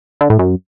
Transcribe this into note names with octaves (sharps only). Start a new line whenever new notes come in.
D3
A2
F#2